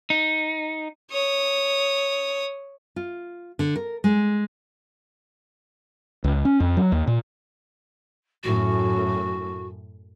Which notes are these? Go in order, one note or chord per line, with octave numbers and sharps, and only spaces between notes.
D#4
C#5 D#6
F4
D3
A#4
G#3
C#2
C#4
F2
F#3
D#2
A#2
F#2 A2 F#4